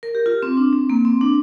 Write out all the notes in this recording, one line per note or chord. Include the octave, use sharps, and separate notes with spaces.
A#4
G4
F4
C4
D4
C4
A#3
C4
D4